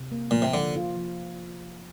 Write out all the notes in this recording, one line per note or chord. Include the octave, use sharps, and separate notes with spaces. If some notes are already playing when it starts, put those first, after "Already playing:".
Already playing: C3
A#3
A#2 F3
C3
D3 F3
F4
F3